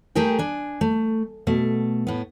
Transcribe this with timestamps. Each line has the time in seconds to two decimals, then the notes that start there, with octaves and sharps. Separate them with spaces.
0.15 A3 G4 G#4 A#4 G5
0.39 D4 G#5
0.81 A3
1.47 B2 A3
2.07 A2 B3